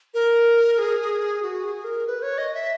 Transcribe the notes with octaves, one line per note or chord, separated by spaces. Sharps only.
A#4
G#4
F#4
G#4
A#4
B4
C#5
D#5
E5